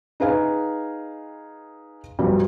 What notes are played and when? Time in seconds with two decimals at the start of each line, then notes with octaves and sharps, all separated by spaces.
0.20 D#4 G#4 B4 F5 G#5
2.19 B1 G2 F3 G3